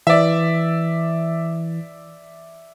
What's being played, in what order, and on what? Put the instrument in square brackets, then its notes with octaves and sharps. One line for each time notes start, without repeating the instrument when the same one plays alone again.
[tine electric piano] E3 [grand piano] D5 E5